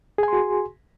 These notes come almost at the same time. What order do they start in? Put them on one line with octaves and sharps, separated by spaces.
G#4 G#5 C6 F#4